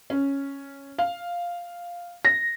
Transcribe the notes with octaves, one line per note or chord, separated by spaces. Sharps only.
C#4
F5
A#6